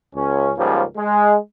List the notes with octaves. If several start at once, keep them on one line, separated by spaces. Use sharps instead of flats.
C#2 C#4
C#2 G#2 F3 G3 A#3 C#4
G#3